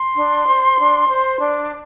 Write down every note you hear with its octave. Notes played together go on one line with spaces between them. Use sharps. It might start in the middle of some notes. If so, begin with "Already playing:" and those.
Already playing: C6
D4
C5
D4
C5
D4